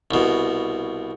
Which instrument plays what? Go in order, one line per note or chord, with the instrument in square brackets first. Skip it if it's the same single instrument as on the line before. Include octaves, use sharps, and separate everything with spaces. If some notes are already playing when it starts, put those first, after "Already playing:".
[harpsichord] C2 B2